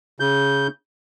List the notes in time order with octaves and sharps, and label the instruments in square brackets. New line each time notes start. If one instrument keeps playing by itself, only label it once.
[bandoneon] C#3 G6